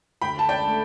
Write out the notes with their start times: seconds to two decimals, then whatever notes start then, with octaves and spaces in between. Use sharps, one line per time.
0.22 D2 G5 B5
0.39 A5
0.49 D5 G5
0.63 D3 A3